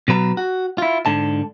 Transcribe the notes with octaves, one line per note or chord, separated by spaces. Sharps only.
B2 F#3 B4 A#5
F#4
E4 F4
G#2 D3 A5